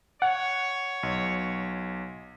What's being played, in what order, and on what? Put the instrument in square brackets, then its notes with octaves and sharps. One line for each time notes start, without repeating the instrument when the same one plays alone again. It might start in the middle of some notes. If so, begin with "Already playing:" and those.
[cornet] C#5 [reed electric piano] F#5
[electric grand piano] B1